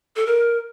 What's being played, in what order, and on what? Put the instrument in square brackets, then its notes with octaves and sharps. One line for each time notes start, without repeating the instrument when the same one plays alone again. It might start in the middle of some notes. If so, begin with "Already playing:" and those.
[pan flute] A4
A#4